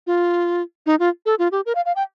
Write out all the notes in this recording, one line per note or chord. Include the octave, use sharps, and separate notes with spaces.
F4
D#4
F4
A4
F4
G4
A#4
F5
F5
G5